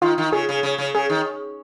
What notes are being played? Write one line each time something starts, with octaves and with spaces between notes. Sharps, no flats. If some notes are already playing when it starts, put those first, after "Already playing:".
D#3 F4
D#3
C#3 G#4
C#3
C#3
C#3
C#3 G#4
D#3